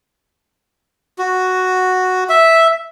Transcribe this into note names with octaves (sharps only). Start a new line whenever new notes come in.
F#4
E5